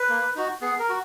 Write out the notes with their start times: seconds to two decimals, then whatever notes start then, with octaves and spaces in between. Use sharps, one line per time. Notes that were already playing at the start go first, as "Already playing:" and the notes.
Already playing: B4
0.09 A#3
0.35 D#4 F#4
0.61 B3 G#4
0.79 A#4
0.89 F#4